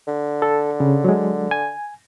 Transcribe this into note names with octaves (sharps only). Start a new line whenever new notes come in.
D3
A4
C#3
F#3 G#3
G#5